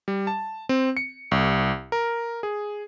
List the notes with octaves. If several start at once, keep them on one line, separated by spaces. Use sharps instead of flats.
G3
A5
C4
C#7
C2
A#4
G#4